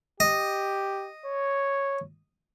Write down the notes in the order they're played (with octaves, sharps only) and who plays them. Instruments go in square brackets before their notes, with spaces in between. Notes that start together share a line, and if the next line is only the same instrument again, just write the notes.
[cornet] G4 [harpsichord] D#5
[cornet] C#5